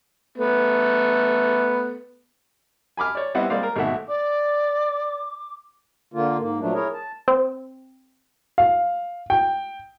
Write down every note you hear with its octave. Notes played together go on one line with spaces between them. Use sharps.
A3 B3
G#5 B5 D6 F6
C#5 D5
G3 B3 C4 E4 D#5 F#5
G3 G#3 A#3 C4 D5 F5
A#4
G#1 B2 A3 E5 F#5
D5 D6
D3 A#3 F4
G#2 A#3
A#2 F3 F#3 A3 D4
E4 G#4 A#4 C#5
A5
C4
F5
G5